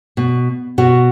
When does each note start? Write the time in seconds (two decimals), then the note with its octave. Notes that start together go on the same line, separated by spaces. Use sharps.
0.17 B2
0.78 B2 F#4